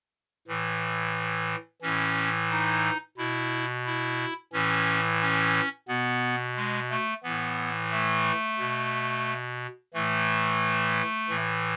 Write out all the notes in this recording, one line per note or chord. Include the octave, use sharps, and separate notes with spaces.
A2 E3
A2 E3 C#4
D#4
B2 E4
E4
A2 E3 C#4
C#4
B2 B3
G#3
A3
A2 E3 B3
A3
B2
A2 E3 A3
A2 E3